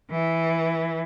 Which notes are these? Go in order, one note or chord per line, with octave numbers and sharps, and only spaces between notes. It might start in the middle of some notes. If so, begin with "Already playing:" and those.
E3